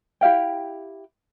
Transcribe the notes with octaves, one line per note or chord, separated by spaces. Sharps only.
E4 G4 F5 G5